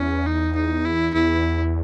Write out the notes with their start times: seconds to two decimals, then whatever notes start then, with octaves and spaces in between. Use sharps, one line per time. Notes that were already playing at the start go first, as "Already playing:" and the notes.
Already playing: E2 C#4
0.27 D#4
0.56 D#4
0.85 E4
1.14 E2 E4